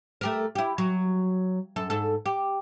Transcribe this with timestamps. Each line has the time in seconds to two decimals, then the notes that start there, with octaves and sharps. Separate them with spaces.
0.21 A3 G4 A#4
0.55 E4 G4
0.78 F#3
1.76 F#2 A4
1.90 G#2 A4
2.26 G4